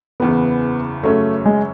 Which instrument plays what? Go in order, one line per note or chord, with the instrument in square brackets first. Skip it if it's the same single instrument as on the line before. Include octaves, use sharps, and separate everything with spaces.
[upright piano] F#1 E2 C#3 [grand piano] B3
[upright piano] F#2 C#3 F#3 C#4 [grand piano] A3
[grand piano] G#3